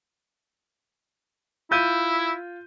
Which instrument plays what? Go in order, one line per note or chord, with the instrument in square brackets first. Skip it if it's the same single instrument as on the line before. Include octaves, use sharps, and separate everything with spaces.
[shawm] E4 [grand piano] F4 G6 D#7